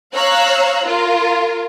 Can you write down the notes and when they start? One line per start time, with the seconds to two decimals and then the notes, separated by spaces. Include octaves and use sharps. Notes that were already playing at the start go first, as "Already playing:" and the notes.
0.14 C#5 F5 A#5 E6 F#6
0.86 F4 A#4